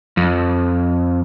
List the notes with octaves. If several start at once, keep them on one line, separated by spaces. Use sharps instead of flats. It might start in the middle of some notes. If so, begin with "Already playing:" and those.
F2